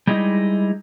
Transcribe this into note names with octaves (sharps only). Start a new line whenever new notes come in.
G3 G#3 D#4 E4 D#5